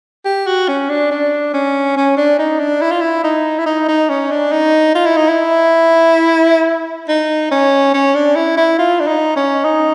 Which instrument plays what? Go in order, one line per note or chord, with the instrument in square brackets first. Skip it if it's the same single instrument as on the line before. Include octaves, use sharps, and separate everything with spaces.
[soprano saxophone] G4
F#4
C#4
D4
D4
C#4
C#4
D4
D#4
D4
E4
F4
E4
D#4
E4
D#4
D#4
C#4
D4
D#4
F4
E4
D#4
E4
D#4
C#4
C#4
D4
E4
E4
F4
D4
D#4
C#4
D#4